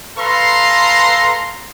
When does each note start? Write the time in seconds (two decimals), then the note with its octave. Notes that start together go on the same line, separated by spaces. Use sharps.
0.18 A4 B4 F5 A#5 C6